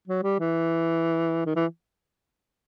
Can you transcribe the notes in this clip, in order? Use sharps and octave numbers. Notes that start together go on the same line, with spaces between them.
F#3
G3
E3
D#3
E3